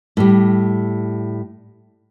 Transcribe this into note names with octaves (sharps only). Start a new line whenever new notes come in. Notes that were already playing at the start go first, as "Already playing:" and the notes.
A2 G3